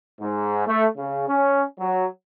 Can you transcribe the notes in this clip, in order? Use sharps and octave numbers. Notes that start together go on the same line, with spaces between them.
G#2
A3
C#3
C#4
F#3